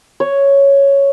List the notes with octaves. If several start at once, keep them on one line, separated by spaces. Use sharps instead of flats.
C#5